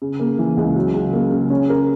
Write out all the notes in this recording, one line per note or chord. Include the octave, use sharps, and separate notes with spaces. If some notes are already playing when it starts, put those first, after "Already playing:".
C#3
A#3
E3
C#2
F#3
C#3
A#3
C#3
C#4
A#4